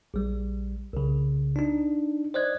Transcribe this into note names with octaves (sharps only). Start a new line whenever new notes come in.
A#1 G3
C2 C#3
D4 D#4
C5 D5 D#5 F#6 G#6